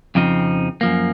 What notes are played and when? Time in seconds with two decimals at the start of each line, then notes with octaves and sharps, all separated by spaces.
0.15 F2 C#3 F3 C4 D#4
0.81 F#2 F3 A#3